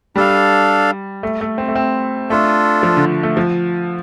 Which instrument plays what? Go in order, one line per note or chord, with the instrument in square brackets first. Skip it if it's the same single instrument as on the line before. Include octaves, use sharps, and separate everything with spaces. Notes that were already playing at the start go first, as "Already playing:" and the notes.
[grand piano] G3 [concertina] D4 A4 F5
[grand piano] A3
A3
C4
A3
C4
[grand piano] A3 [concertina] D4 F4 A4
[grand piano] F3
D3
A3
F3